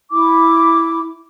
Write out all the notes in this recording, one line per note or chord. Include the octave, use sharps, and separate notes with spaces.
E4 D6